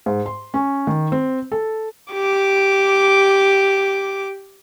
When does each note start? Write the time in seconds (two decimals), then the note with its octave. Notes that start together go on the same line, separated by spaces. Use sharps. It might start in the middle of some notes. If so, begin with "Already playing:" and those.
0.06 G#2
0.26 C6
0.54 C#4
0.87 D#3
1.12 C4
1.52 A4
2.13 G4 D6